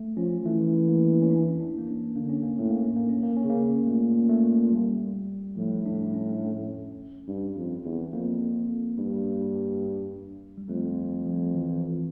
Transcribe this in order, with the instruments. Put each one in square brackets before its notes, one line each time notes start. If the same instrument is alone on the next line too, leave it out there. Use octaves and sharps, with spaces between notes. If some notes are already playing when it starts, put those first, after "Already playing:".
Already playing: [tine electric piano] A3
[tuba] F3 [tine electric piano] C#4
[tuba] E3 [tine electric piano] A3
[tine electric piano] A#3
C#4
D4
D4
A#3
C#4
[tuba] D3 [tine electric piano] A#3
[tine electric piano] C#4
A#3
[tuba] A2 [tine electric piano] C#4
[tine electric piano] A#3
C#4
A#3
C#4
A#3
C#4
[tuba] C#3
[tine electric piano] A#3
[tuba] A#2 [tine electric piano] A3
[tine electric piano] A3
G3
[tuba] A2 [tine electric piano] F3
[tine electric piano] D4
C#4
[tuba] G2
F2
E2
[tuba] F2 [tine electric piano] A#3
[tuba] G2
[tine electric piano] G3
[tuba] F2 [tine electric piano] A3
[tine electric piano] F3
E3